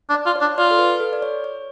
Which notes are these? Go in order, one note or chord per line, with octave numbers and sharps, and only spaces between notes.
D4
D5
F4
C#5
D4
F4 D5
A4
B4
A4
D5
C#5
C#5